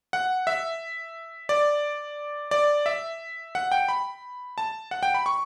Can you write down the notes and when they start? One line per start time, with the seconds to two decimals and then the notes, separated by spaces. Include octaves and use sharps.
0.13 F#5
0.47 E5
1.49 D5
2.51 D5
2.86 E5
3.55 F#5
3.72 G5
3.89 B5
4.58 A5
4.91 F#5
5.03 G5
5.14 B5
5.26 C#6